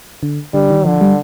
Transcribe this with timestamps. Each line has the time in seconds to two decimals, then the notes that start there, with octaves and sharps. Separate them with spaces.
0.23 D3
0.54 D3 G3
0.70 D#3
0.85 D3 F3
1.01 G3